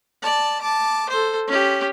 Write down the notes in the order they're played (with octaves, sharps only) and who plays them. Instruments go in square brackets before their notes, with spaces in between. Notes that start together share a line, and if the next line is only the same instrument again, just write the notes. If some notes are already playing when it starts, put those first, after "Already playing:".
[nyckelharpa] D5 A5
A5 D6
A4 C5
C#4 G4